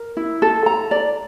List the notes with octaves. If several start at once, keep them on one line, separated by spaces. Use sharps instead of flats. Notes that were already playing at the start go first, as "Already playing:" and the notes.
Already playing: A#4
E4
A4
A#5
D5